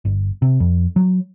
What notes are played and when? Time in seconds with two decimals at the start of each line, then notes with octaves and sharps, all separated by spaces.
0.05 G1
0.42 C3
0.60 F2
0.96 F#3